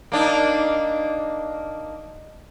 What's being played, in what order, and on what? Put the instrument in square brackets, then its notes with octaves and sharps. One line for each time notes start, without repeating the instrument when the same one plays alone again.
[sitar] A#3 D4 D#4